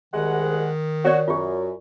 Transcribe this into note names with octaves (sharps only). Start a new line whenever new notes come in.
C2 D#3 G#3 F#5
F#4 C#5 D5
F#2 F4 G4